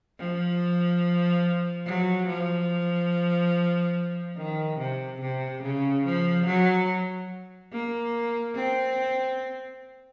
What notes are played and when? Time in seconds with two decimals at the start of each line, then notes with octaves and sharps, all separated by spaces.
0.19 F3
1.86 F#3
2.28 F3
4.36 D#3
4.78 C3
5.20 C3
5.62 C#3
6.05 F3
6.46 F#3
7.72 A#3
8.55 C4